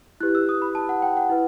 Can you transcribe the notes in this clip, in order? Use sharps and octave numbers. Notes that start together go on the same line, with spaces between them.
E4 G4 B4 F#6
E6
D#6
B5
A5
F#5
G5
F#5
E4 B4